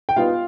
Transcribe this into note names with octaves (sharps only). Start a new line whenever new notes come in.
G5
G3 B3 D#4 F4 F5